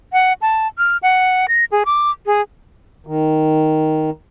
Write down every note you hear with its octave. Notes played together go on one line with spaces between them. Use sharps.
F#5
A5
F6
F#5
A#6
G#4
D6
G#4
D#3